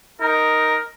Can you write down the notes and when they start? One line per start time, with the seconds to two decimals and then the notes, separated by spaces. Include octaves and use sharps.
0.21 D#4 A#4